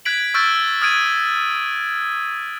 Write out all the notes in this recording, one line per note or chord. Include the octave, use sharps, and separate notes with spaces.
F#6 G#6 B6 D7 F#7
C#6 E6 F6 G6 A6 D7
D#6 F6 G#6 D7 D#7